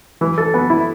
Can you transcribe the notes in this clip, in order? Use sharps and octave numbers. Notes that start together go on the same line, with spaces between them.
E3
A4
B3
E4